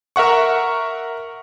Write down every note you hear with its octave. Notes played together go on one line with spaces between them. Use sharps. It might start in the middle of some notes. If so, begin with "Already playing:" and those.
A#4 E5 F#5 C#6